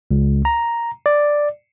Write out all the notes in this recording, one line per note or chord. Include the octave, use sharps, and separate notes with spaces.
C#2
A#5
D5